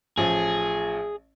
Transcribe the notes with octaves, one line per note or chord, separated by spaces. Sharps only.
A1 F3 G#4